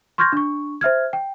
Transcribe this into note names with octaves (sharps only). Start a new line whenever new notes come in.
C6 C#6 F6 G6 G#6 A#6
D4 C#6
C5 E5 F6 G#6
G5